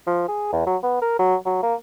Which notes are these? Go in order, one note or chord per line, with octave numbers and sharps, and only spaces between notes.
F3
G#4
E2
F#3
B3
A#4
F#3
F#3
A#3